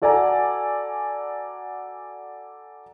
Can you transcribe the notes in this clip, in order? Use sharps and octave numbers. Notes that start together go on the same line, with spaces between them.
F#4 A4 D5 F#5 G#5 A#5